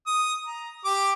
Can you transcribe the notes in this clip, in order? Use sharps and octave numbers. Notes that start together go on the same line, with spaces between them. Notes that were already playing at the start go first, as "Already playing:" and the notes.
D#6
A#5
G4 D6